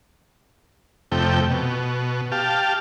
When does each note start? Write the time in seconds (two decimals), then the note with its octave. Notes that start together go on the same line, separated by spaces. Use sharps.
1.12 F2 C3 A3 G5
1.50 B2
2.32 G4 F5 A5